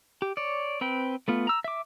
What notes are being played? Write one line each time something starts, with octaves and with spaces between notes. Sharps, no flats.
G4
C#5 D5
C4 B4 G5
A3 B3 F4
A#5 E6
E5 D6